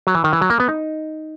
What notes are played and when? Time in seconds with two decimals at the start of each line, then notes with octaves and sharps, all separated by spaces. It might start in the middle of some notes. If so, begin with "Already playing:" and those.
0.07 F#3
0.15 E3
0.24 D#3
0.33 E3
0.41 F#3
0.50 A#3
0.60 B3
0.68 D#4